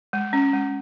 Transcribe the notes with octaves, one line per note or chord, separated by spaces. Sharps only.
G#3
C#4
G#3